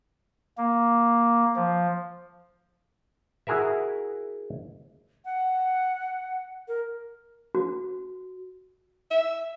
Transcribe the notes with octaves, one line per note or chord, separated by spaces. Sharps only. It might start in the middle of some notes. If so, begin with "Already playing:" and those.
A#3
F3
E4 F#4 G#4 A#4 E5
F#5
A#4
F#4
E5